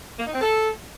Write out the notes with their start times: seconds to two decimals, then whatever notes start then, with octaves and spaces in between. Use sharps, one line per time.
0.18 A#3
0.26 D#4
0.33 C4
0.41 A4